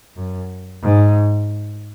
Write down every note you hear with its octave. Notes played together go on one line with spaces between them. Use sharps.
F#2
G#2